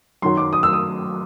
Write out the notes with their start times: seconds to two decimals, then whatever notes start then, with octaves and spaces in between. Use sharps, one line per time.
0.22 F#2 D#3 F#3 C6
0.37 D6
0.53 D#6
0.63 E6
0.73 D#6